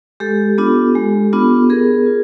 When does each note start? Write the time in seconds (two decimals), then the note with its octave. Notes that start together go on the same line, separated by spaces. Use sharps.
0.20 G#3 G4 A4
0.58 B3 D4 F4
0.95 G#3
1.33 B3 D4 F4
1.70 B3 G#4 A#4
2.06 F4